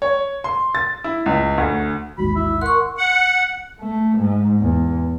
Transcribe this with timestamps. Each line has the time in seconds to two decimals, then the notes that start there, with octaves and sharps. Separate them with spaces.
0.02 C#5
0.44 C6
0.75 A6
1.04 E4
1.26 C#2
1.58 D2
2.18 A1 D#2 G#2 F#4 B5
2.36 E4 E5
2.61 A#4 F#5 C6 C#6
2.98 F#5
3.81 A3
4.19 G#2
4.60 E2